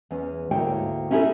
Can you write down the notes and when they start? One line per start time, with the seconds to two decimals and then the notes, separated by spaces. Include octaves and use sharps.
0.11 E2 C#4
0.51 D2 G#2 A#3 E4 C#5 G5
1.11 C#4 D#4 E4 F#4 G#4 A4